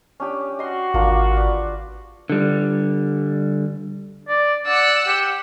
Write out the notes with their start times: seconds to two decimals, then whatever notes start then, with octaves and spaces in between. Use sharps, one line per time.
0.20 C#4 D4 G4
0.59 F#4 D#5 C6
0.94 G#1 A#3 D4 F4
1.37 B4 D5
2.30 D3 G3
4.29 D5
4.67 D5 F#5 E6
5.07 G4